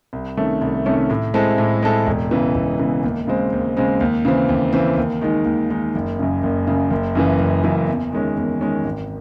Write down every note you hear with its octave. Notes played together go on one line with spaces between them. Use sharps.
C2
C3 D#3 A3 C#4
C2
C3 D#3 A3 C#4
A2
G#3 C4 E4 A4
A2
G#3 C4 E4 A4
E1
E2 C#3 E3
E1
E2 C#3 E3
D#2
C#3 G#3 C4
D#2
C#3 G#3 C4
D#2
C#3 E3 C4
D#2
C#3 E3 C4
D#2
D#3 G#3 D#4
D#2
D#3 G#3 D#4
F#1
F#2 C#3
F#1
F#2 C#3
F#1
F#2 C#3 E3
F#1
F#2 C#3 E3
E2
D#3 G#3 C#4
E2
D#3 G#3 C#4
G#1